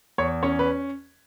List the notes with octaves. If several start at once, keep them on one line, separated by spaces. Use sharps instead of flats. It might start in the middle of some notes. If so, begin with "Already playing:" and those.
E2 C#5
C#4 C#5
B4